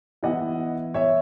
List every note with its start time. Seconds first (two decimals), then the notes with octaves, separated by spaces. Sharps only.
0.23 E3 B3 E4 D#5 F#5
0.94 C#5 E5